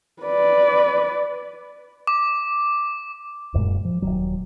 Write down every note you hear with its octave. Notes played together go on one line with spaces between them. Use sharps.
B4 D5
D6
D1 F#2 A#2 G#3
F3
D#1 B1 F#3